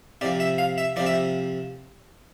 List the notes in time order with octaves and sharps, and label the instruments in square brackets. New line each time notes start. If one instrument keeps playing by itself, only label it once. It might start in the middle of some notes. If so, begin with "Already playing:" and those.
[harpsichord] C3 D5
F3
E5
F5
E5
C3 F3 D5
E5